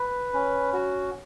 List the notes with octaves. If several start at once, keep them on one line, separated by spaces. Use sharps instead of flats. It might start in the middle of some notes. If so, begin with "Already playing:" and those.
Already playing: B4
C#4
F#4